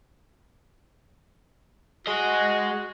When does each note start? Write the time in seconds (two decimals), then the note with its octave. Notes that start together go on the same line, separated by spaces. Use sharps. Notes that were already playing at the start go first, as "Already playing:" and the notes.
2.07 F#4 G#4 D#5